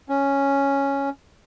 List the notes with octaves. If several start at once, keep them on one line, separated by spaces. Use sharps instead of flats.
C#4